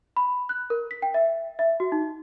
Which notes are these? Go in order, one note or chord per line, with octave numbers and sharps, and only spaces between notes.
B5
F#6
A#4
B6
G5
E5
E5
F#4
D#4